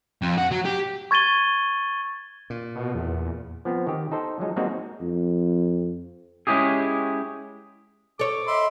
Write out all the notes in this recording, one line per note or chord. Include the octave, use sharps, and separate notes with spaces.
F2
F#4
F#3
G4
C#6 G#6 A6 D#7 G7
A#2
B2
E2
F3 B3 C4
D#3 G4
D#4 A4 C5
F3 F#3 G#3 D#4
G3 G#3 A#3 C4 D#4 F#4
F2
G#3 C#4 E4 G4 G#4
A4 C#5 D6
D#5 E5 B5 C6